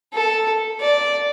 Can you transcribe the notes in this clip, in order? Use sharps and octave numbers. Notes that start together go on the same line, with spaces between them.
A4
D5